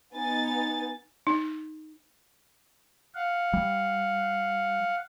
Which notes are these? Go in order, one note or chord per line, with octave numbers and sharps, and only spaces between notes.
B3 D#4 G#5 A6
D#4
F5 F#5
G3